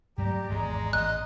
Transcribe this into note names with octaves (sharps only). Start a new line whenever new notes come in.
G2 F#3 A3 G4 D5 A#5
G#1 E2 G#3
A1 D#5 F#6